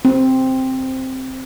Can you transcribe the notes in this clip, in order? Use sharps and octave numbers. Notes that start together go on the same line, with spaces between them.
C4